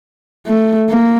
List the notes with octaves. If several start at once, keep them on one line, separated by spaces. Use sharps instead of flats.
A3
A#3